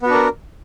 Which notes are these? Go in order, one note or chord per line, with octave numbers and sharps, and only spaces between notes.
B3 D4 F#4 A#4